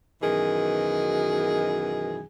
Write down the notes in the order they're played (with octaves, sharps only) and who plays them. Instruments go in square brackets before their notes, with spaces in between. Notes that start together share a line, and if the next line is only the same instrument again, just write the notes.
[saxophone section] F#2 B2 D#3 E3 G#4